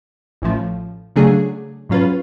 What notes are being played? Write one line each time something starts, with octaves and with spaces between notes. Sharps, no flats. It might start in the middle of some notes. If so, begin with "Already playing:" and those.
A1 A2 F3
C#3 F#3 A3 D4 G#4
G#2 F#3 C#4 F4 B4